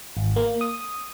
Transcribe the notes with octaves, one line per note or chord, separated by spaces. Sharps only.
G#1
A#3
D#6